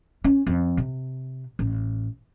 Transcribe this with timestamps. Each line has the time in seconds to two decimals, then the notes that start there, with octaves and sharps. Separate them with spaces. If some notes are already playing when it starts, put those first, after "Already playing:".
0.24 C#4
0.46 F2
0.77 C3
1.59 A1